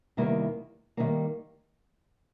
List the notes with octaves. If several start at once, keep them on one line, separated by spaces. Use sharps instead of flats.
E2 C3 D#3 G3 A#3
C3 D#3 G3 A#3